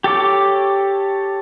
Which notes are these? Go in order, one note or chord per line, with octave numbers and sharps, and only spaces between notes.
G4 A4 C#5 D6